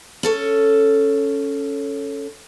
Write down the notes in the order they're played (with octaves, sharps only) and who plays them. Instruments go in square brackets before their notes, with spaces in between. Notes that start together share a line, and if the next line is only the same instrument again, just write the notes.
[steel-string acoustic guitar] C#4 A4 C#5